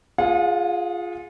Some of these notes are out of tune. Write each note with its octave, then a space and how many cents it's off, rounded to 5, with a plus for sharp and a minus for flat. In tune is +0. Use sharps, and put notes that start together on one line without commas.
F4 +0 G#4 +0 F#5 -45